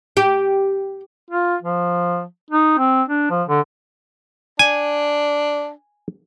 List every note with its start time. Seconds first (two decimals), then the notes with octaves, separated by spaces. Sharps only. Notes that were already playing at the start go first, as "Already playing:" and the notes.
0.17 G4
1.30 F4
1.62 F3
2.51 D#4
2.78 C4
3.09 D4
3.30 F3
3.48 D3
4.59 D4 G#5